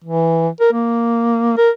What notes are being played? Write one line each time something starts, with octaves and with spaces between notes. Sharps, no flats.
E3
A#4
A#3
A#4